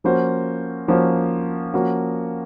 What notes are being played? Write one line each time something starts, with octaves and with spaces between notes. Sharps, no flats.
F3 A#3 C#4 F#4 C5
F3 A#3 C#4 F#4 C5
F3 A#3 C#4 F#4